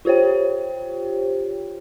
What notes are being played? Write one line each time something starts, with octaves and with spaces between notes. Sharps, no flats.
F4 G4 C5 C#5 G5